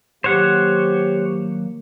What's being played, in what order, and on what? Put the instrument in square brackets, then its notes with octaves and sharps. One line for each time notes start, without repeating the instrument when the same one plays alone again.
[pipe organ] D#3 F#3 A#3 [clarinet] G4 [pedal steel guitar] C5 C#5 F#5